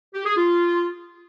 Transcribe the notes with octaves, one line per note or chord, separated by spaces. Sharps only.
G4
G#4
F4